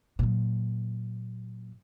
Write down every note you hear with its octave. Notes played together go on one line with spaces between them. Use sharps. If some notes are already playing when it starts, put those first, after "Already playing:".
A#2 F#3